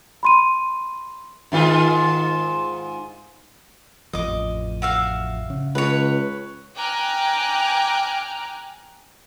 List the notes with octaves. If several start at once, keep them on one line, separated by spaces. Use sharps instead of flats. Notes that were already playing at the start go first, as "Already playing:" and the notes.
B5 C6 D#7
G#2 D#3 F4
A1 F2 F3 D#5 D6
F#4 E5 F5
C#3
C#2 B4 C#5
G5 G#5 A#5 D6 F6 F#6